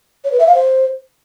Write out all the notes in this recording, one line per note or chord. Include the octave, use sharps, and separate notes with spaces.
C#5
B4
E5
F5
C5